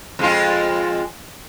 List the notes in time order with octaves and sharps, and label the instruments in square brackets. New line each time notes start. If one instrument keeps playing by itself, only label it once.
[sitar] F2 G#3 F4